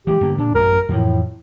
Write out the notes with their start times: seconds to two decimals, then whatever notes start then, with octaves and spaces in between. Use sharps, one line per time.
0.07 E3 G3 G#3 G4
0.21 G2 D3 A#3
0.38 A#2 D4
0.55 A1 F#2 A#4
0.89 F2 A2 E3 F3